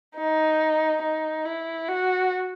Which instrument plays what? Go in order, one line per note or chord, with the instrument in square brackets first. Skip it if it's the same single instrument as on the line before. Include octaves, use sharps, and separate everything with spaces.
[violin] D#4
D#4
E4
F#4